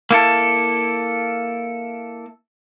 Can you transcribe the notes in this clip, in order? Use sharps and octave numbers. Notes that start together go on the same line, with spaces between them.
A#3 E4 A4